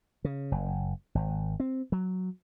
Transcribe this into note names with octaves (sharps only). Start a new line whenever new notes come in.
C#3
F#1
G#1
C4
F#3